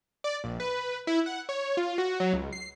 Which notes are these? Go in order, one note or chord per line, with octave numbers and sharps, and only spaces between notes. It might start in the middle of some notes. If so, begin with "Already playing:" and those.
D5
A#1
B4
E4
F#5
C#5
F4
F#4
F#3
C#2
C7